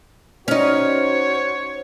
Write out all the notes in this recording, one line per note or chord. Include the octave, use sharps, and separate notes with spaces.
C#4 D#4 F#4 C5 C#5